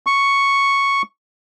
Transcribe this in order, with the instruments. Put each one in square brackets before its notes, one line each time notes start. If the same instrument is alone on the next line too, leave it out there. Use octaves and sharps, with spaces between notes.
[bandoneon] C#6